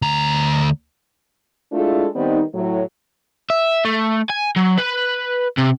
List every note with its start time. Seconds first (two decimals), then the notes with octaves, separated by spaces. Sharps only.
0.02 D2 A#5
1.72 G#3 A3 D4 E4 F4 A4
2.16 D#3 G3 B3 C4 D#4
2.54 A2 F#3
3.50 E5
3.85 A3
4.29 G#5
4.56 F#3
4.78 B4
5.58 C3